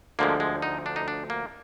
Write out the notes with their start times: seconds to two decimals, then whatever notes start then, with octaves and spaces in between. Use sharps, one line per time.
0.19 D2 D3 F3 G#3 A#3
0.40 G#3
0.62 D#4
0.86 D4
0.96 D#4
1.08 D4
1.30 A#3